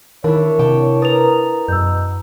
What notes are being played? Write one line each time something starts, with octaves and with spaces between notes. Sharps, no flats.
D#3 D4 E4 A#4 C#5
C3 G5 A5 D6
A#4 B4 A#5 D#6 A6 F7
F#2 B2 E6 G6